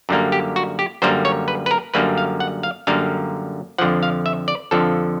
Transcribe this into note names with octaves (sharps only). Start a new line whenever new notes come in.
F#2 D3 G3 A#3
G4
F#4
G4
F#2 D3 G3 A#3 C5
C#5
B4
B4
A#4
F#2 D3 G3 A#3 B4
F5
F#5
F5
F#2 D3 G3 A#3 F5
F2 D3 F3 F#5
F5
E5
D5
F2 D3 F3 A4